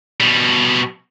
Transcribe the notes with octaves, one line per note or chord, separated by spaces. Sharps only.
B2 G3